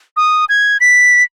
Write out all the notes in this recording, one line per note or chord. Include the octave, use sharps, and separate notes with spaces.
D#6
G#6
B6